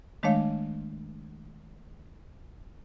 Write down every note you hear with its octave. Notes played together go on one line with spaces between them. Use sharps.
D#3 G#3 A3 D4 C#5 F5